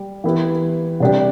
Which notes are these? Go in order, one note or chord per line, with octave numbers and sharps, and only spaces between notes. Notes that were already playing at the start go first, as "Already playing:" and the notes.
Already playing: G3
E3 B3 E4 G4 B4
C3 G3 D4 G4